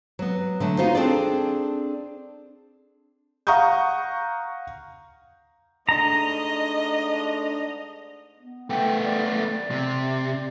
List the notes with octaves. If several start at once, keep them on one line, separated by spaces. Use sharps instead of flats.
F#3 B3
D3 F#3 A3
B3 D#4 F4 F#4 C5
C4 D4 G#4 A4 D5
F5 F#5 A#5 C#6 D#6 G6
G#2 A3 D4 D#5 A#5
B3
A3 B3 G5
D5
C3